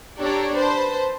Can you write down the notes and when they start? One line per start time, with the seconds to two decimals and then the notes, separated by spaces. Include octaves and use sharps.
0.18 D4 G4 A4 C#5 D5 A#5
0.56 B4 C5 A5